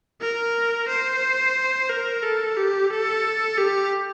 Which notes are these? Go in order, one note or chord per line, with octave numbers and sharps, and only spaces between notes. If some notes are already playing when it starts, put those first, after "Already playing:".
A#4
C5
A#4
A4
G4
A4
G4